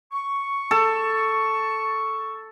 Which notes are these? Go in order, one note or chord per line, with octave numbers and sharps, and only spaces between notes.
C#6
A4